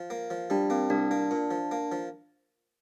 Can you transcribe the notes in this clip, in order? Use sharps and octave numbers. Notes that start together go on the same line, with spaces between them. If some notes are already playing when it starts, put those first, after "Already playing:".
Already playing: F3
A#3
F3
G3 D4
A#3 C4
C2 D4
A#3 D4
A#2
F3
A#3
F3